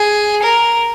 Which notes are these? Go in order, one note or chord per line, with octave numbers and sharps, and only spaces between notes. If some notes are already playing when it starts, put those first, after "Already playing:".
Already playing: G#4
A#4